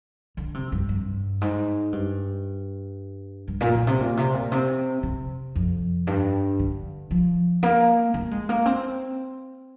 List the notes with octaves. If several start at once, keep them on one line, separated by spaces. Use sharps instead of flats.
D3
C3
G2
G2
G#2
G2
G2
A#2
A#2
C3
A#2
C3
A#2
C3
C3
F2
G2
D3
F3
A#3
A#3
G#3
A#3
C4